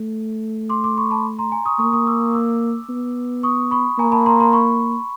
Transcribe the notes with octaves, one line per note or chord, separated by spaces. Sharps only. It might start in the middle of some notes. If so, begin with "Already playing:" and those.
Already playing: A3
C6 D6
C6 D6
B5 C#6
A5 B5
A#5 C6
G#5 A#5
C#6 D#6
A#3 C#6 D#6
C#6 D#6
D6 E6
D6 E6
B3
C#6 D#6
B5 C#6
A#3 G#5 A#5
A5 B5
A#5 C6
A#5 C6
B5 C#6